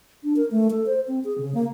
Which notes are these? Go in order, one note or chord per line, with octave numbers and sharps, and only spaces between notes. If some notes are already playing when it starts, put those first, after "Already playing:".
D4
A#4
A3
A4
C5
C4
G#4
C#3
A#3